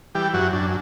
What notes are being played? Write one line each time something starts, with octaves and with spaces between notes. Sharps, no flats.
E3 G3 G4
F#2 F#3 F#4
F#2 D4